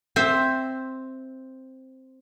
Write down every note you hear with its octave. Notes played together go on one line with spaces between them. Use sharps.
C4 C5 E5